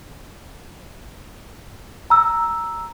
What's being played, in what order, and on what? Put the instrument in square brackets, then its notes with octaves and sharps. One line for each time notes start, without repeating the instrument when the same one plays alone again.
[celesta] A#5 E6